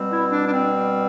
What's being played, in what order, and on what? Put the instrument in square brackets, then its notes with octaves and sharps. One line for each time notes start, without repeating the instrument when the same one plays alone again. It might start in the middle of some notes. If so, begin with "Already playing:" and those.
Already playing: [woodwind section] B2 G3 C4
E4
D4
D4
C4